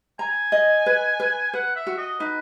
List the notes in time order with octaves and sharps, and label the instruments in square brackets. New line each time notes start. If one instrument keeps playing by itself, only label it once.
[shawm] G#5 [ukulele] A#5
[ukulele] D#5
B4
B4
[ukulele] B4 [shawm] F#5
[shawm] E5
[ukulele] F#4
[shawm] D#5
[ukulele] D#4 [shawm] B4